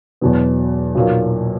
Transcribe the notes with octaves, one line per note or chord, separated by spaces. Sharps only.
E2 B2 F#3 B3
B1 A#2 F#3 A#3